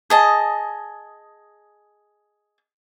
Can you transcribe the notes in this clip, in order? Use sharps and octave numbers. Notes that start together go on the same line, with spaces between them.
G#4 D#5 A5